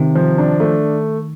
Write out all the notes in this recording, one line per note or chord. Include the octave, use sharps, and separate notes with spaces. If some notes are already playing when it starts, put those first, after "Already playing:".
Already playing: C3 D#3
F3
D4
A3